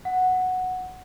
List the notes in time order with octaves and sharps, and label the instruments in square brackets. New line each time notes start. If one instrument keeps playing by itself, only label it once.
[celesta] F#5